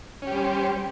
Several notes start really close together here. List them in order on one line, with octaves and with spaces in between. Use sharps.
C#4 G4 G3 C5